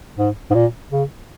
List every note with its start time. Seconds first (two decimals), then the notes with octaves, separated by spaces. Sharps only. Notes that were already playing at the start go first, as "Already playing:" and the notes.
0.18 G#2
0.51 G#2
0.55 A#2
0.92 C#3